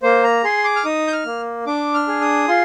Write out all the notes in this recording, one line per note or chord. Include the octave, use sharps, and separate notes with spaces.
A#3 C5
A#5
G#4 C6
D6
F6
D#4 D#6
G6
F6
A#3
D4 D6
F6
G#4
D#6
F4 C6